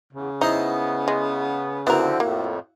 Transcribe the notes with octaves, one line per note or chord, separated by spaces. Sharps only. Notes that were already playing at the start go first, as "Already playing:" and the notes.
E2 C#3
B3 D#4 E4 C5 D#5
G#3
D3 F3 B3 C4 E4 F#4 A#4
F2 A2 A#3